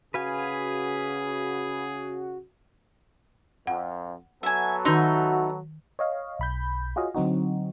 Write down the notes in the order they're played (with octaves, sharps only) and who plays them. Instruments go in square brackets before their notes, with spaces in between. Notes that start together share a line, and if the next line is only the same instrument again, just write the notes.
[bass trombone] C#3 [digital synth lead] F#4 [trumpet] G#4 [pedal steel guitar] B4 F5 G#5
[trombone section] F2 [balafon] F#5
[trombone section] F#3 B3 A4 [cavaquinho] E5 G#5
[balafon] D#3 C6 [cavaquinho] D#4 E5 [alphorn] F#4
[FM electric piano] C#5 D#5 F5
B1 B5 G6
F4 F#4 G#4 C#5 D#5 F5
D3 F#3 C4 D#4 F#4